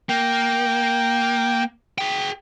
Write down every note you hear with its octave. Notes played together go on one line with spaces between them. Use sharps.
A#3 G5
G#4 G5